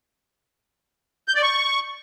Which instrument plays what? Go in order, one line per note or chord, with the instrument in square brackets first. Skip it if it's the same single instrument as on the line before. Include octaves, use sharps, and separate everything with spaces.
[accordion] G6
D5
C#6